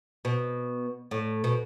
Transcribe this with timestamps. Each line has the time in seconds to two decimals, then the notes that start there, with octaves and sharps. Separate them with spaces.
0.25 B2
1.11 A2
1.44 B2